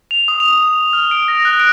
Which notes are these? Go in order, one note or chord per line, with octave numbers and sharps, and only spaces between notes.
F7
D#6
F7
F6
D7
A#6
F#6
D7